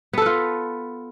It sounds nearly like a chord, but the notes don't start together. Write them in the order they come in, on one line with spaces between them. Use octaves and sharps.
B3 A4 B4 F4